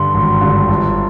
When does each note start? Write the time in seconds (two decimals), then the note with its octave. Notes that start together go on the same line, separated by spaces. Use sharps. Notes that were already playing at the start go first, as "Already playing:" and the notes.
Already playing: G2 D3 C6
0.14 G#1
0.41 G2 D3
0.69 G1